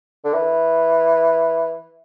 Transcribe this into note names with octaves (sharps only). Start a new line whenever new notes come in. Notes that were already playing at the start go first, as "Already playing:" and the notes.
D3
E3